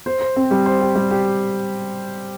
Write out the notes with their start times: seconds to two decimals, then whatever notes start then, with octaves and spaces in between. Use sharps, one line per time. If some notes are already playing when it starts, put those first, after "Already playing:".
0.06 C5
0.21 C5
0.36 C4
0.51 G3
0.66 C5
0.81 G4
0.95 G3
1.11 G4